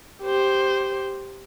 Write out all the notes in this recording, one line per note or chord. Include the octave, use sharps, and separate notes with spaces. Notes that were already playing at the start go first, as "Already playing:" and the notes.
G4 C5